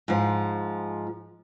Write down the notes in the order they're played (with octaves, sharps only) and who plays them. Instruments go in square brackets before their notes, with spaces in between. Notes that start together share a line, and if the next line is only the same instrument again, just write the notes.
[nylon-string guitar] G#2 F3